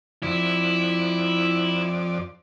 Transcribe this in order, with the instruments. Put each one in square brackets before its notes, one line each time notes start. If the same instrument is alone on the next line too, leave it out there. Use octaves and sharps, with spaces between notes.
[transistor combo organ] F2 D5 [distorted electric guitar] E4